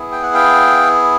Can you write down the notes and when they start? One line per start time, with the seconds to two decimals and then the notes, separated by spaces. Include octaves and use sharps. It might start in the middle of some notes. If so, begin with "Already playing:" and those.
Already playing: B3 E4 G#4
0.12 G5
0.23 F#5
0.34 F5 G5